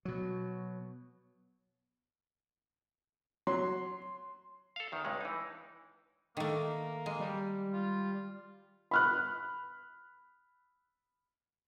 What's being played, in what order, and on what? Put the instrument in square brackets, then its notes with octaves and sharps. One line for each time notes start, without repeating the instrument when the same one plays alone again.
[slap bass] B2 F#3
[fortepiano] F#3 [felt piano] C6
[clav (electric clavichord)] A4 F5
E2 D#3
C#2 G2 C3 G#3
E3 D#4
[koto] D#3 A3 [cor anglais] A#3
[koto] G#3
[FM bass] G3
[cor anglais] F4
[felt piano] B5 F6 F#6